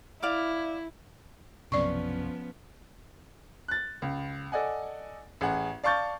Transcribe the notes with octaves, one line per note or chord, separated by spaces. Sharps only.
E4 D5 F5 D6
B1 F#2 C3 F3 B3 C#4 D5 C#6
F#6 A6
C#2
A4 D5 D#5 F#5 G#5
A1 G#4 F#5
D5 F5 A5 C#6 G6 A6